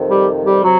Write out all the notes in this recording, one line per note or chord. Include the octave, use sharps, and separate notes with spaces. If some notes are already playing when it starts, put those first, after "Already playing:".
Already playing: F2 C3 D#3
G3 G4
G3 G4
C3 F#3 F#4